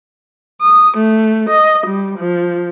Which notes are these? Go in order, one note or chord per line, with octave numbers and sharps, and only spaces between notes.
D#6
A3
D#5
G3
F3